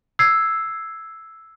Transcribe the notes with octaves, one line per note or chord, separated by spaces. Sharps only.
E6 G#6 C7